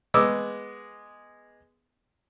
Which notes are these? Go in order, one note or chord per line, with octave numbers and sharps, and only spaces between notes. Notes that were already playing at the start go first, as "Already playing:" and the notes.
G#3 B3 D6 E6